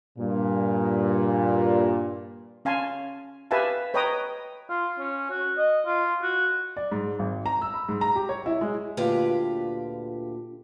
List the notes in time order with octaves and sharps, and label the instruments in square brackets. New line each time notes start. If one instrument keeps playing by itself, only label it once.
[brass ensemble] G2 A#2
[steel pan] C#4 F5 G#5 A5 C6
G4 B4 E5 F5 G#5 A5
B4 C#5 D#5 G5 A#5 D#6
[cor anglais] F4
C#4
F#4
D#5
F4
F#4
[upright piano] D5
G#2
G#1
A#5
E6
B5
G#2
A#5
G4
C#5
E4
G#3
[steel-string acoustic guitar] D2 A#2 D3 F4 G4 B4